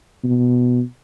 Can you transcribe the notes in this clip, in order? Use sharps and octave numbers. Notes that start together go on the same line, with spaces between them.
B2